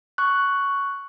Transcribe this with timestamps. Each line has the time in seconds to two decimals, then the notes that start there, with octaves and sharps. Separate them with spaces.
0.18 C#6 F#6